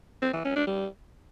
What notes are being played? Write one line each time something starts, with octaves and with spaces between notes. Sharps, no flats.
C4
E3
C#4
D4
G3